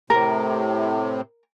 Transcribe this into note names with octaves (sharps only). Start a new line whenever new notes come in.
A2 C3 A#4